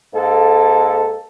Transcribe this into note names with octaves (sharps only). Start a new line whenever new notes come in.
G#2 A#3 A4